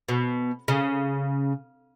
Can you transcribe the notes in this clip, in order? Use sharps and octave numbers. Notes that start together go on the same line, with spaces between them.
B2
C#3